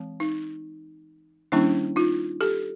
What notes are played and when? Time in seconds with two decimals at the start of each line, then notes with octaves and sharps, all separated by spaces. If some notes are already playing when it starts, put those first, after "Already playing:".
Already playing: E3 G#3 C4
0.20 D#4
1.52 D#3 G3 A#3 C#4 D4 E4
1.96 D#4 F4
2.41 G4 A4